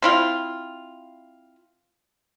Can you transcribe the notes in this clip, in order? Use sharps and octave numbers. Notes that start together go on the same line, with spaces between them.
C4 E4 F4